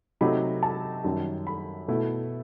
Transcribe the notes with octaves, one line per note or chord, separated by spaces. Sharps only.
C3 F#3 A3 D#4 B5
A5
F#2 D#3 G3
B5
B2 A3 E4